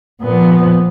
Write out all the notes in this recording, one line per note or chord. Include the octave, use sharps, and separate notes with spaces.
A#2 F3 B3